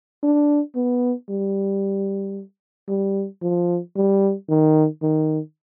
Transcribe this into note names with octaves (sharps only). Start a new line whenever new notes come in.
D4
B3
G3
G3
F3
G3
D#3
D#3